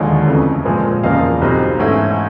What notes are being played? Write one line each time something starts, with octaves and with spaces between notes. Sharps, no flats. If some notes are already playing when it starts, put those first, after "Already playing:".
Already playing: E1 D#2 D3 F3 G#3 C#5 D#5
F2 C#3 E3 A3
A#2 F3 G#3 C4
E1 E2 C#3 F3 A#3 D#5 F5
B1 B2 G3 C4 D#4
G#2 E3 A3 C#4 E4